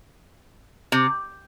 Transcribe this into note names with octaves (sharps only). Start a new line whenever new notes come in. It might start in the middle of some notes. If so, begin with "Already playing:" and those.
C3